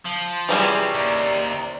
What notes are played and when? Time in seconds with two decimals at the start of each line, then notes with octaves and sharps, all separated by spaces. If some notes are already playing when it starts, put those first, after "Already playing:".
0.06 F3
0.49 C3 E3 G3 C#4 G#4 G#5
0.94 D#2 D5 A#5